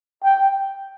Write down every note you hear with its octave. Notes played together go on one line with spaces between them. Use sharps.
G5